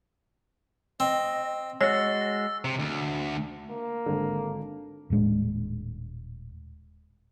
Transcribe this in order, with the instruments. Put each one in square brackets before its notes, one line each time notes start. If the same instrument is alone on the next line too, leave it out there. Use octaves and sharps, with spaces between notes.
[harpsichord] C4 [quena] D#5
[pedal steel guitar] G#3 F#4 [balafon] C#5 [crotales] E6 A6
[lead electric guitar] C3
D2
[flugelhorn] A#3
[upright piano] G#1 D3
[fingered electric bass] D#1 A2 G#3 D4